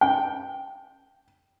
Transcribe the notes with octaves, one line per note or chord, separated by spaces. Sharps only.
G5